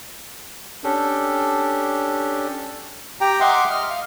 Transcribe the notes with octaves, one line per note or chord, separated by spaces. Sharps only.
C#4 D4 G4 A4
G4 G5 A#5
D#5 E5 F#5 C6 D6
D#5 F6
F5